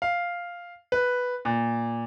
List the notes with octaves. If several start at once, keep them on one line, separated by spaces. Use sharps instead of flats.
F5
B4
A#2